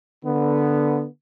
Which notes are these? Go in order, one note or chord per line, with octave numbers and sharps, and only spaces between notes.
D3 B3